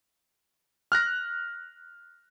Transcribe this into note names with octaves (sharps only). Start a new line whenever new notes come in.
F6 F#6 A#6